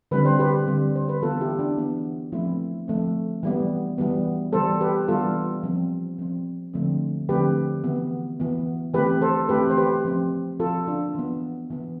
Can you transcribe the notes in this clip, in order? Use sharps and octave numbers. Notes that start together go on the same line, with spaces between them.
D3 G3 C4 B4
C5
G4 B4
D3 G3 C4
C5
B4
E3 B3 F4 A4
E4 G4
D4
E3 B3
F3 A3 C4 E4
F3 A3 C4
E3 G3 B3
E3 G3 B3
E3 G3 B3 A4 C5
G4 B4
E3 G3 B3 F4 A4
F3 C4
F3 C4
D3 F3 A3 C4
D3 F3 A3 C4 G4 B4
E3 B3
E3 B3
E3 A3 C4 G4 B4
A4 C5
E3 A3 C4 G4 B4
C5
G4 B4
F3 C4
F3 C4 F4 A4
D4 F4
E3 B3
E3 B3